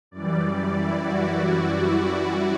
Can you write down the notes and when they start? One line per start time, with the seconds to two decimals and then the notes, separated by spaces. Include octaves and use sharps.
0.11 F#2 E3 G3 D5
0.70 E4
1.00 F#4